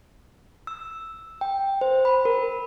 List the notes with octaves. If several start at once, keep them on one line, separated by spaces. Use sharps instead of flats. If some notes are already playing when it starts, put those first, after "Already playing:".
E6
G5
C5
B5
A#4